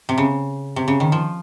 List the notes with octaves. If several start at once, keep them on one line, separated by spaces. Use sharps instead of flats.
C3
C#3
C3
C#3
D#3
F3